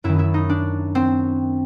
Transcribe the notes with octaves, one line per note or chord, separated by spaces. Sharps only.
F#2 D#3 E4
E4
D#4
D4
C4